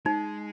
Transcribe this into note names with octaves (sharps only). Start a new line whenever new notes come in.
G#3 D#4